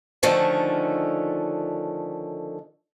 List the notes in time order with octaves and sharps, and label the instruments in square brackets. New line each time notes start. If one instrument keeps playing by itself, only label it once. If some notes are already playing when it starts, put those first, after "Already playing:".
[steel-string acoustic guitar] D3 D#3 F3 A3 C#4